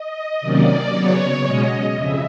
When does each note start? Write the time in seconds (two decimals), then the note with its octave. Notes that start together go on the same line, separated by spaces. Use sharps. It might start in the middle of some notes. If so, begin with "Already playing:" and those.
Already playing: D#5
0.40 C3 D#3 F#3 A#3 C#4 D5
0.93 C#3 F#3 B3 C#5
1.45 B2 G#3 C#4 D#5
1.97 F2 C#3 E5